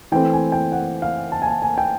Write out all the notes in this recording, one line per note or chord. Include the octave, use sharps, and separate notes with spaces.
E3 A3 C4 G5
G#5
G5
F#5
F5
A5
G#5
A5
G#5
G5